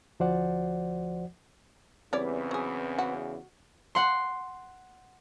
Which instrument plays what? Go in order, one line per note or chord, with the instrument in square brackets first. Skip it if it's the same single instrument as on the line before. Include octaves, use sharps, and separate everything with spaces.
[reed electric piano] D2 F3 F#4 C5 D5 F#5
[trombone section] E2 C#3 [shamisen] G3 C#5 D5 [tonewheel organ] C4 B4
[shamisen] F#3 G#4
F#4
[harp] F#5 C6